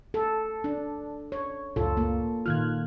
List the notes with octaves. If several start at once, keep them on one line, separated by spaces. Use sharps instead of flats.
A4
D4
C#5
C#2 F#2 A2 F4 A4
A#3
A#2 D#3 F4 F6 F#6 G#6